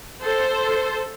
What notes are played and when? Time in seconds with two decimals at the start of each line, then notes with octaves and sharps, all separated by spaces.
0.22 A4 C5